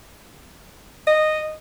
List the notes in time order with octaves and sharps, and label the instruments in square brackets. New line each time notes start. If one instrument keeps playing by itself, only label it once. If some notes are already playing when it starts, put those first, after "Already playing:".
[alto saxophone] D#5